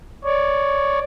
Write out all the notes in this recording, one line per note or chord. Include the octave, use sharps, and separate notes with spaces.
C#5 D5